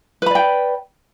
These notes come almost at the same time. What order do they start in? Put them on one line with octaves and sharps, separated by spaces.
B4 B5 D5 G5